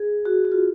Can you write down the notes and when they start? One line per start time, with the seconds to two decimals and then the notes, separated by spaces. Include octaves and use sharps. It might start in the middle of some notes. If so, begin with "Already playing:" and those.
Already playing: G#4
0.25 F#4
0.45 F#4
0.52 F4